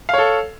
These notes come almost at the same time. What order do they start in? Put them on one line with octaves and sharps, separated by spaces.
F5 C#5 A4